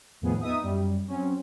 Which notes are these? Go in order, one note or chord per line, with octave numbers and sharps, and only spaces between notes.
E2 A2 D#3 F3 B3 G#4
B3 D#4 E5 D#6
F#2 G3
F#3 C4 C#4